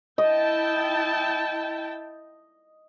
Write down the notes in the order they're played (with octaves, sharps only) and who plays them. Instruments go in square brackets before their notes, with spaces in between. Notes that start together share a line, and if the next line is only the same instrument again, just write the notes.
[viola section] E4 G5 A5 [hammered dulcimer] D#5